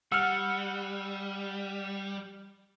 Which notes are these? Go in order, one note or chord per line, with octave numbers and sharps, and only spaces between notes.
G3 F#5 E6 F6